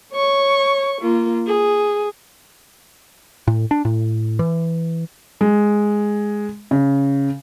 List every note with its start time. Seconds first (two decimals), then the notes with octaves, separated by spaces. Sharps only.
0.12 C#5 C#6
1.01 A#3 F4
1.47 G#4
3.47 A2
3.71 D4
3.85 A2
4.39 E3
5.41 G#3
6.71 C#3